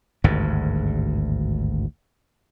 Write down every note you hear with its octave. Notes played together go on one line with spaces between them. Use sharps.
G#1 D2 G2